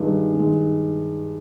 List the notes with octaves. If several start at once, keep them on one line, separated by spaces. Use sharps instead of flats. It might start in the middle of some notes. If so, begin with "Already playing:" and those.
Already playing: G2 D#3 G#3
D#3
G#3